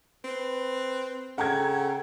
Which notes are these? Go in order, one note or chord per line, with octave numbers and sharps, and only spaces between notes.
C4 B4
C#3 A4 F#5 G5 A#5 G#6